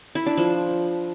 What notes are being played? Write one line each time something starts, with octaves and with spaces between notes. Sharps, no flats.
E4
D4
F3